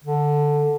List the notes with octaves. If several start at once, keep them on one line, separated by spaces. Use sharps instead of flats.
D3